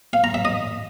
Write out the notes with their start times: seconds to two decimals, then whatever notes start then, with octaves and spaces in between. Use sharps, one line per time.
0.13 F5
0.24 A#5
0.34 E5
0.45 D#5